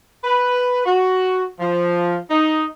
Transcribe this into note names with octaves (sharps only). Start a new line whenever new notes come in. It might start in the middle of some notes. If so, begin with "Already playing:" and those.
B4
F#4
F3
D#4